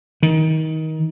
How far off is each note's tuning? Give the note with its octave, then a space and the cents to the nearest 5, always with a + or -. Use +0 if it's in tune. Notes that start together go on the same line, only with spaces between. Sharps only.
D#3 +25